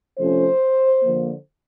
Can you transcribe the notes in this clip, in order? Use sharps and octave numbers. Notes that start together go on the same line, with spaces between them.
C3 F3 A3 C#4 C5
D3 F3 A#3